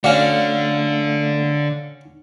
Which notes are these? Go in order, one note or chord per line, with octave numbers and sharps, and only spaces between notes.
D3 A3 C#4 F#4 D5 F5